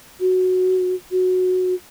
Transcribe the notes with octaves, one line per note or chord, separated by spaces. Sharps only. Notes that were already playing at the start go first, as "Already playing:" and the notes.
F#4
F#4